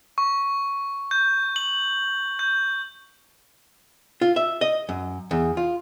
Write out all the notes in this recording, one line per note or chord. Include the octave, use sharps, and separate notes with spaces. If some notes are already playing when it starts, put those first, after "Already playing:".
C#6
G6
F#7
G6
F4
E5
D#5
F#2
E2
F4